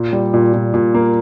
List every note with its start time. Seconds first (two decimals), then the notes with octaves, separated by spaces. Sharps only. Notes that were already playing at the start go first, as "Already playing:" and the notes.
Already playing: A#2
0.13 G3
0.34 A#2
0.53 A#2
0.74 A#2
0.94 A#3